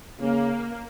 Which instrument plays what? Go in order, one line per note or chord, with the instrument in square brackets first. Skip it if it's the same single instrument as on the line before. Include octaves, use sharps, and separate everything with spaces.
[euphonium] C#3 [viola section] A#3